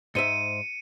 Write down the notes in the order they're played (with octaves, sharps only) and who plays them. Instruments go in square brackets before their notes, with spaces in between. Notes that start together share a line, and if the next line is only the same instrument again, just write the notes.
[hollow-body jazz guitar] G#2 C5 E5 [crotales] C#7 D#7